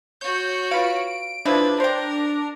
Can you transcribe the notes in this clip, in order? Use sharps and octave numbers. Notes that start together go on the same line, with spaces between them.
F#4 C#5 G6
F4 B4 F5 D7
C#3 F3 D4 E4 B4
A#4 C5 G5